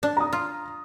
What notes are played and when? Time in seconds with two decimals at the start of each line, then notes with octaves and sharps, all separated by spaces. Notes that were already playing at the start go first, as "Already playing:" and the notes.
0.03 D4
0.17 A#5 D#6
0.33 F4